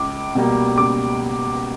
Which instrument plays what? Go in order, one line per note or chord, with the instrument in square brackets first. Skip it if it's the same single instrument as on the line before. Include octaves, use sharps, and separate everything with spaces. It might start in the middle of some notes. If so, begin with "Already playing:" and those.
Already playing: [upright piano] C#2 D6
B2 G3 A#3
C#2 D6